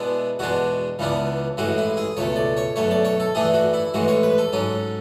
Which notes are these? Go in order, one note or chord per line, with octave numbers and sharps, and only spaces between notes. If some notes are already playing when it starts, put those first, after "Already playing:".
Already playing: B2 G#3 B3 D4 E4
E2 B2 G#3 D4 F#4
C#2 C#3 E3 B3 D4
A1 A2 E3 G#3 F#4
E4
G#4
C#2 B2 A3 C#5
D5
C#5
B1 B2 A3 C#5
D5
C#5
A4
A2 E3 A3 D4 G#4
F#4
E4
A1 A2 E3 G#3 F#4
C#5
B4
A4
G#2 F#3 C#4